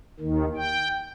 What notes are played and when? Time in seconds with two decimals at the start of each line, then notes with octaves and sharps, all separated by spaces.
0.20 D#2 D#3
0.56 G5